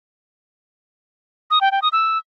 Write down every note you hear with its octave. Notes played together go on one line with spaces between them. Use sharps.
D#6
G5
G5
D#6
E6